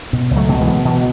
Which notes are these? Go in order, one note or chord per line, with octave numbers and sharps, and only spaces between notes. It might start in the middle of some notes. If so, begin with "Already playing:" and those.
B2
C#2
F#3 A3
B2
E3 G#3
B2
B2 E3